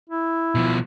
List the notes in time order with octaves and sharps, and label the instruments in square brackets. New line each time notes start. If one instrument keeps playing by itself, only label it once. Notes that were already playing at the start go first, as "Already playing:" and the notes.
[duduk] E4
[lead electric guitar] B2 F3